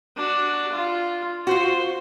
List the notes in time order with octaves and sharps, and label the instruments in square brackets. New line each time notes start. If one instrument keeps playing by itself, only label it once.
[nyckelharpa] D4 F#4
F4
[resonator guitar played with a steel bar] F4 F#4 [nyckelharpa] C5